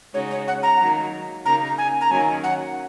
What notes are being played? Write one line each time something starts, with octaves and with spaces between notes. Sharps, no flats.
C#3 G#3 D#4 F#4 C#5
C#5
F#5
A#5
D#3 F#3 A#3 F#4
C#3 A#3 D#4 A#5
G#5
A#5
D#3 F#3 A#3 C#4 G#5
F#5